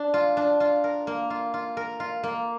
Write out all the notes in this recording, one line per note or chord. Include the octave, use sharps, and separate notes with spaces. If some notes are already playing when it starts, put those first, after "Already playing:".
Already playing: D4
F4
D4
F4
A#4
A#3
F4
F4
A#4
F4
A#3